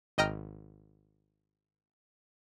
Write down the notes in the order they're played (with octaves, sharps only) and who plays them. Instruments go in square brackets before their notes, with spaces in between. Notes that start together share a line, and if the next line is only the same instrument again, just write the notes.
[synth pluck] G#1 D#5 G5 A#5 F6